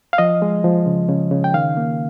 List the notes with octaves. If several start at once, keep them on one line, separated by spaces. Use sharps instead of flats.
F5
F3 D#5
G#3
F3
C#3
C#3
C#3
G5
D#3 F5
A#3